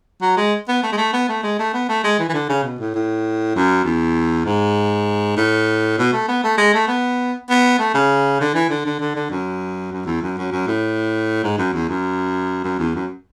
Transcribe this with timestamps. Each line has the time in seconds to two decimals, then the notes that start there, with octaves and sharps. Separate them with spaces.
0.22 F#3
0.37 G#3
0.68 B3
0.83 A3
0.92 G#3
0.97 A3
1.13 B3
1.29 A3
1.43 G#3
1.59 A3
1.73 B3
1.89 A3
2.04 G#3
2.19 E3
2.29 E3
2.34 D3
2.50 C#3
2.64 B2
2.79 A2
2.95 A2
3.56 F#2
3.85 E2
4.46 G#2
5.37 A2
5.98 B2
6.13 A3
6.28 B3
6.44 A3
6.58 G#3
6.74 A3
6.88 B3
7.50 B3
7.79 A3
7.94 C#3
8.41 D3
8.55 E3
8.70 D3
8.85 D3
9.00 D3
9.16 D3
9.30 F#2
9.92 F#2
10.06 E2
10.22 F#2
10.38 F#2
10.52 F#2
10.67 A2
11.44 G#2
11.58 F#2
11.73 E2
11.89 F#2
12.64 F#2
12.79 E2
12.95 F#2